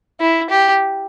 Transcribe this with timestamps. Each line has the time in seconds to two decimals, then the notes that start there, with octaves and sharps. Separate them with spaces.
0.21 E4
0.50 G4